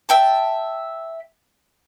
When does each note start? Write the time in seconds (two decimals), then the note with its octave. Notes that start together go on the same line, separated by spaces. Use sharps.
0.09 E5 G5 A5